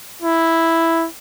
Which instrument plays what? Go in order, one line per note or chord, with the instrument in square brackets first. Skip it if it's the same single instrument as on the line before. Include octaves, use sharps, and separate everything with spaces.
[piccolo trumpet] E4